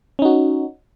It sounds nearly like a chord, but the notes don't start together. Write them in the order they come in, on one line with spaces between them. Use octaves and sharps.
C#4 D#4 F#4